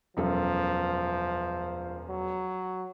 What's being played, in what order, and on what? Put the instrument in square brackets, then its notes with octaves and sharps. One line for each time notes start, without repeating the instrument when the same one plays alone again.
[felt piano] E1 F#2 A4 [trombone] F3
[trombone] F#3